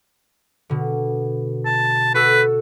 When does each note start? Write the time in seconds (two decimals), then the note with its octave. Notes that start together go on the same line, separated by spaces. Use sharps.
0.69 B2 D3
1.66 A5
2.15 F#4 A4 B4 E6